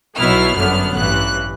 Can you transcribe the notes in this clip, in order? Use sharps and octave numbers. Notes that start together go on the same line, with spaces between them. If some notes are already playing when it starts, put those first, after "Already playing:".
B1 B2 F#3 B3 E4 F6
G1 F#2 D3 F#3 B3 F6
A1 G2 E3 F#6